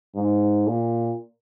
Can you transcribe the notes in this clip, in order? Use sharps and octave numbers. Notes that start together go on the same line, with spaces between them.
G#2
A#2